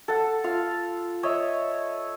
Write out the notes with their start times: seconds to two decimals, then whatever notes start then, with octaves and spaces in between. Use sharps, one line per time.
0.08 A4 F#5
0.44 F4 F5
1.23 C#5 D#5 E5